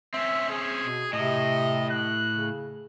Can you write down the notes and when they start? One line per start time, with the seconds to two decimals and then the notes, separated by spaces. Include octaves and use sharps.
0.14 C4 C#4 E5
0.50 G#4
0.82 B2
1.13 A2 C3 D#5
1.90 F#6
2.34 C#3